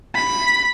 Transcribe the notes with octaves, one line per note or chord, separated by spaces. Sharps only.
B5